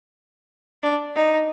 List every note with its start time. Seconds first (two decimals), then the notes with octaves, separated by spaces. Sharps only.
0.83 D4
1.16 D#4